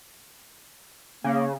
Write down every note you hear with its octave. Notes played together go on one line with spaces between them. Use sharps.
C#3 A#3